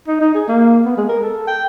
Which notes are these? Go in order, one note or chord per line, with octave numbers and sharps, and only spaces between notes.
D#4
D#4
G#4
A#3
B3
G#3
A#4
A4
G5